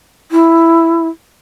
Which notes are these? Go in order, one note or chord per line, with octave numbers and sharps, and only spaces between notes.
E4